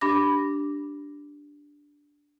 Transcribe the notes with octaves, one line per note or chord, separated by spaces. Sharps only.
D4 G4 B5 D6 A#6